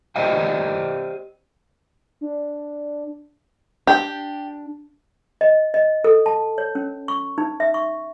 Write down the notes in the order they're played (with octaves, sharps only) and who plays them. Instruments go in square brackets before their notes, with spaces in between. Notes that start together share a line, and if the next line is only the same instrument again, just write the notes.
[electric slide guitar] G4 C5 D5 D#5 F5 G5
[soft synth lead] D4
[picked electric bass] D4 [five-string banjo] G4
[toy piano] D#5
D#5
A4
A5
C#5
C#4
C#6
D#4
E5
C#6